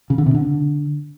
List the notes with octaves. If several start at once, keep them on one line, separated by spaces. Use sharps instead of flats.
C#3
D3
C3
D3